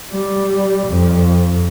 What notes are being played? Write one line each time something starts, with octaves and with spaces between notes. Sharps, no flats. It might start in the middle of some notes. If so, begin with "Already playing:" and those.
G3
F2